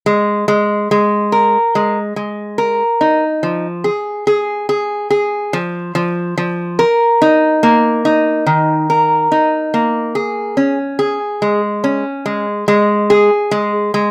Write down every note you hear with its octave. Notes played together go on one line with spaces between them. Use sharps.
G#3
G#3
G#3
A#4
G#3
G#3
A#4
D#4
F3
G#4
G#4
G#4
G#4
F3
F3
F3
A#4
D#4
A#3
D#4
D#3
A#4
D#4
A#3
G#4
C#4
G#4
G#3
C#4
G#3
G#3
G#4
G#3
G#3